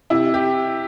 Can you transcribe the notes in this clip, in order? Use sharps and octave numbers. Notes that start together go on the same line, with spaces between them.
C3 E4
G4